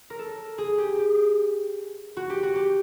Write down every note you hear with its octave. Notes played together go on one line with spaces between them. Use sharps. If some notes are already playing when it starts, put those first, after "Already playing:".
A#4
A4
G#4
G4
G4
F#4
G4
F#4
G4